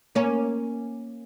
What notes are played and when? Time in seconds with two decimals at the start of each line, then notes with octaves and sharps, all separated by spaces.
0.15 A#3 C#4